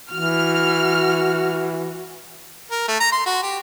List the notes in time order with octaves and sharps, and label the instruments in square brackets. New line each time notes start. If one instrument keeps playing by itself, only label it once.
[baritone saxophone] E3 [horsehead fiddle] F#4 [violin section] F6
[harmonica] A#4
A3
A#5
C6
F#4
G4